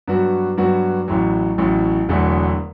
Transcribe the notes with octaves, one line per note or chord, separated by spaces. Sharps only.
G2 F#3 B3 F#4
G2 F#3 B3 F#4
A1 A2 F#3
A1 A2 F#3
E1 E2 D3 F#3 A3